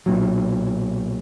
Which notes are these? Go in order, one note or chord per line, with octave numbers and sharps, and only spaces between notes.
B1 A#2 F#3